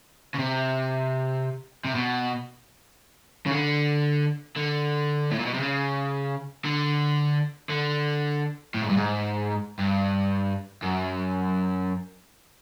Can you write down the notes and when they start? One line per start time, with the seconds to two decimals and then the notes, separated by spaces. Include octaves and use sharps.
0.34 C#3
0.38 C3
1.85 C3
1.95 B2
3.46 C#3
3.51 D3
4.57 D3
5.31 A2
5.39 A#2
5.45 B2
5.53 C3
5.60 C#3
6.65 D3
7.70 D3
8.74 A2
8.82 G#2
8.89 G2
8.97 G#2
9.79 G2
10.82 F#2